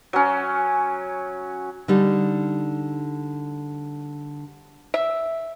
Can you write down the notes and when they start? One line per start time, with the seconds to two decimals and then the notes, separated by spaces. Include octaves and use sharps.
0.13 F#3 C#4
1.88 D3 G3 D#4
4.94 E5